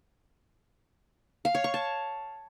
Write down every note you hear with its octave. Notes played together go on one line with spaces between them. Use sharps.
F5
C#5
C#6
A5